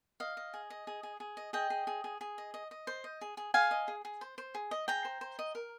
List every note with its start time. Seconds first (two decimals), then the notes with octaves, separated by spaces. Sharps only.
0.20 D#5 F5
0.37 D#5
0.54 G#4
0.70 D#5
0.87 G#4
1.03 G#4
1.20 G#4
1.37 D#5
1.53 G#4 D#5 G5
1.70 G#4
1.87 G#4
2.04 G#4
2.21 G#4
2.38 D#5
2.54 D#5
2.71 D#5
2.87 C5
3.04 D#5
3.21 G#4
3.37 G#4
3.54 G#4 F5 G#5
3.71 D#5
3.88 G#4
4.05 G#4
4.21 C5
4.38 C5
4.55 G#4
4.71 D#5
4.88 G#4 G5 A#5
5.05 C5
5.21 C5
5.39 D#5
5.55 A#4